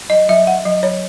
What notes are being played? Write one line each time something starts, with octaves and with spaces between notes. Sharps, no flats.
F#3 D#5
F#3 E5
F#3 F#5
F#3 D#5
F#3 C#5